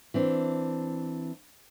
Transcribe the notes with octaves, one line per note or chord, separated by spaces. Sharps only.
E3 C4 D4